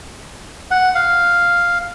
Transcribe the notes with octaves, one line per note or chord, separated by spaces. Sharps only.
F#5
F5